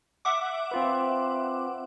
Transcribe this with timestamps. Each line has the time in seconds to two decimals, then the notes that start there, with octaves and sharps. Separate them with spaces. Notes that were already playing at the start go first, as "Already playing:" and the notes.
0.25 E5 F#5 D6
0.71 C4 F4 B4